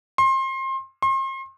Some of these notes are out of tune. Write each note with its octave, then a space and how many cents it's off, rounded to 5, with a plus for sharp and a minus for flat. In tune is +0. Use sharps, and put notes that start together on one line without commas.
C6 +30
C6 +40